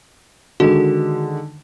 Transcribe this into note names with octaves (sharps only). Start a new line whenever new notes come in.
D3 D#3 G#3 F#4